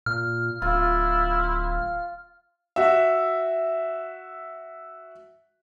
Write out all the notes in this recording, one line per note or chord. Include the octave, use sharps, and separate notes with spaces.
A#2 F6
D1 E4 F4
F#4 E5